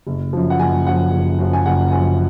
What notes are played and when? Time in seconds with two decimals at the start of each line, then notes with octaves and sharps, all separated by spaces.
0.07 F#1
0.33 F#2 F3
0.50 F#5
0.59 F#1 G#5
0.86 F#2 F3 F#5
1.12 F#1
1.39 F#2 F3
1.53 G#5
1.66 F#1 F#5
1.92 F#2 F3 G#5